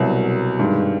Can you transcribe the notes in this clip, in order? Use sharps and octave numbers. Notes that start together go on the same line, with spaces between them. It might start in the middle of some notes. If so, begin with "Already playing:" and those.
Already playing: C2 B2 F#3
G2 D#3 G#3